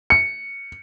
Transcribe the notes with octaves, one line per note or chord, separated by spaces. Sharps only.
C#7